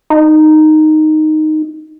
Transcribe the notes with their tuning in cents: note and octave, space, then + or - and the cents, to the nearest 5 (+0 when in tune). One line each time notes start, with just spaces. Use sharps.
D#4 -5